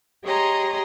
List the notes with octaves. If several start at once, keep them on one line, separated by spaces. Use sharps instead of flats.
G4 G#4 C#5 D#5 A#5 C6